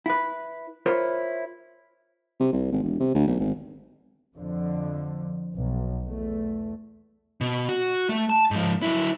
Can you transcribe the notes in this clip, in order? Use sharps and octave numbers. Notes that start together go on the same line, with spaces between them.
E4 B4
E4 F4 A#4 C5 C#5
C3
C2
G#1
E1
C3
D2
B1
G#1
F2 D3 F3
B1
E2 A3
B2
F#4
A3
A5
G#2 F3
F#3 E4